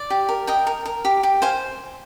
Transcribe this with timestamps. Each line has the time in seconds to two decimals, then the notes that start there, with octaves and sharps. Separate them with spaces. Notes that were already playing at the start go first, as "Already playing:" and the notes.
Already playing: D5
0.10 G4
0.29 A#4
0.47 A#4 D#5 G5
0.67 A#4
0.86 A#4
1.05 G4
1.23 G4
1.42 C5 F5 G#5